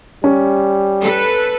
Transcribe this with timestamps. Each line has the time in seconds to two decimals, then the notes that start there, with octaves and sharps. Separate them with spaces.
0.24 G3 C#4
1.02 A4 B4